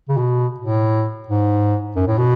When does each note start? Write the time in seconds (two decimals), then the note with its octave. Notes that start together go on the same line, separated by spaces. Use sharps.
0.09 C#3
0.17 B2
0.60 A2
1.28 G#2
1.96 F#2
2.07 A2
2.18 B2